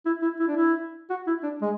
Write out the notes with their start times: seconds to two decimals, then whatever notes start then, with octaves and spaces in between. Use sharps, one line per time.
0.06 E4
0.22 E4
0.39 E4
0.48 D4
0.56 E4
1.10 F#4
1.27 E4
1.43 D4
1.61 G#3